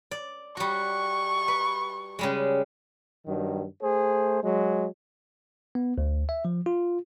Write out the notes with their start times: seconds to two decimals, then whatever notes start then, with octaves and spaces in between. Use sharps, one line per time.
0.11 D5
0.57 G3 F#4 C#6
1.48 B4
2.19 C#3 G3 G#3
3.26 G2 D#3 F#3
3.82 A3 G#4 C5
4.43 F#3 G#3
5.75 B3
5.98 D2
6.29 E5
6.45 F3
6.66 F4